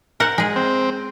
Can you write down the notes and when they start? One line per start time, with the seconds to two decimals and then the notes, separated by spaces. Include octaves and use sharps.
0.20 A#4 C5 F#5
0.38 G#3 G#4
0.56 C4